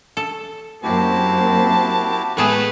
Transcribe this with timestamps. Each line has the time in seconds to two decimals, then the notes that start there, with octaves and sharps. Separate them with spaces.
0.17 A4
0.84 F#2 A#3 C4 E4 F#4 G4 A5
2.37 A2 G#3 A3 B3 G#4 B4 A5